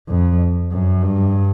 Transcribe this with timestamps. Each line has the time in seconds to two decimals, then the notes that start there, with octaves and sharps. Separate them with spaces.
0.09 F2
0.72 F#2
1.03 G2